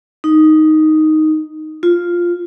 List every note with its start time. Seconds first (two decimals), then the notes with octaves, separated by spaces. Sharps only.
0.24 D#4
1.83 F4